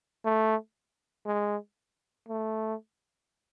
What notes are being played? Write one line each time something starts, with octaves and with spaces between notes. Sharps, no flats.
A3
G#3
A3